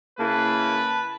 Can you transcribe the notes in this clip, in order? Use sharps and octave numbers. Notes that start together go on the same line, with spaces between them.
C#3 A#3 E4 B4 A5